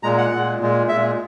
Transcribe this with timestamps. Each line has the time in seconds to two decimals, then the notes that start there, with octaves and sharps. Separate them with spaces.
0.03 A#2 G#3 A#5
0.18 F#5
0.32 A#2 G#3
0.60 A#2 G#3
0.89 A#2 G#3 E5